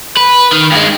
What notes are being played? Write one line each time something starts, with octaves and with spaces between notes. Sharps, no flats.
B4
D#3
G2 G#3